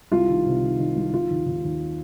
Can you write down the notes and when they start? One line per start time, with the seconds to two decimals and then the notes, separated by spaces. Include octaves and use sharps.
0.12 C2 F4
0.28 D#3
0.46 C3
0.63 D#3
0.79 D#3
0.96 C2
1.13 D#3 F4
1.30 D#2
1.46 D#2
1.64 D#2